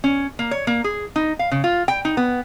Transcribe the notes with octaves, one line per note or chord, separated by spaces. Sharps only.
C#4
A#3
C#5
A#3
G#4
D#4
F5
C#3
F4
G5
D#4
B3